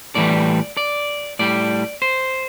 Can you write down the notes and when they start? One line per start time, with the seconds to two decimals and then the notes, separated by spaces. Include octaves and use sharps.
0.15 A2 E3 G3 D5
0.77 D5
1.39 A2 G3 D5
2.02 C5